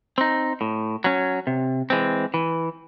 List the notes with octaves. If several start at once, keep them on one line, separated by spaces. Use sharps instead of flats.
C4 D#4
A2
F#3 C#4
C3
E3 G#3 C4
E3